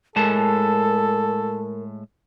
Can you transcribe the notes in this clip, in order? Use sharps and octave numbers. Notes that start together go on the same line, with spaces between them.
A2 G#3 A4 A#4 A5